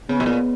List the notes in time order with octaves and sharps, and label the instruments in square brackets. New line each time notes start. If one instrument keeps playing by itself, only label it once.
[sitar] C#3 [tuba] B3
[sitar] B2
A#2